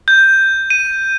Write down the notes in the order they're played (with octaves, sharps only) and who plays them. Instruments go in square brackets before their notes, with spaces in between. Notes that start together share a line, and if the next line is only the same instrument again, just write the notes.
[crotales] G6
D#7